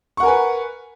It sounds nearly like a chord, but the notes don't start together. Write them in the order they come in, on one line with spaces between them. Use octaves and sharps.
C#6 F#5 A#4 G#5 B4